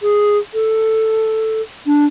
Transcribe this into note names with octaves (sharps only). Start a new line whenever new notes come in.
G#4
A4
D4